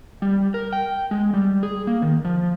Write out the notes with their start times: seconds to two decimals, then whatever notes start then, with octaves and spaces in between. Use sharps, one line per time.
0.22 G3
0.54 A#4
0.73 G5
1.11 G#3
1.34 G3
1.63 G#4
1.87 A#3
2.02 D#3
2.25 F3